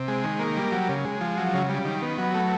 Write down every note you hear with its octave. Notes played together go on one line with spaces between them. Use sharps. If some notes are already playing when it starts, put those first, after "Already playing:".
Already playing: C3
G#3
D#3
A#3
G3
F#3
C#3
G#3
F3
F#3
C#3
G3
D#3
B3
F#3
A3